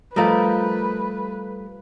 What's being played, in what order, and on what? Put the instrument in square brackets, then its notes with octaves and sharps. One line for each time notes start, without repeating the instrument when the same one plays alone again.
[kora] F3 A#4 D#5 [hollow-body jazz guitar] G3 A3 [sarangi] B4